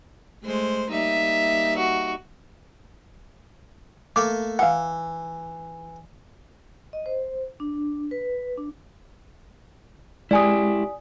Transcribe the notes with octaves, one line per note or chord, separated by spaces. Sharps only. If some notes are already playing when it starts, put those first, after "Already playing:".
G#3 A3 C5
G3 A#3 D#4 E5
F#4
A3 A#3 A4 D6
E3 F5 F#5
D#5
C5
D4
B4
D4
G#3 E4 G4 D5 G#5 D#6